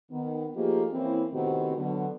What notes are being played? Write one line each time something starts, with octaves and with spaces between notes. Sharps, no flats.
D#3 B3
F3 A3 A#3 D#4 G4 G#4
E3 A#3 C4 C#4 E4
A2 C3 D#3 B3 C4 F#4
B2 D3 F#3